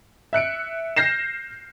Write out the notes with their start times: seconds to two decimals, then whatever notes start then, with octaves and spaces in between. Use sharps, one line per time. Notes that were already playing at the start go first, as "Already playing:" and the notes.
0.33 E5 F#6 C#7 D7
0.97 F6 G6 A#6 C7 E7